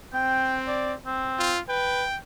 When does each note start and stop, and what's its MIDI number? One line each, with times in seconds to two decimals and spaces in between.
0.14 0.95 60
0.14 0.61 79
0.68 0.93 74
1.06 1.56 60
1.39 1.60 65
1.69 2.05 71
1.69 2.17 79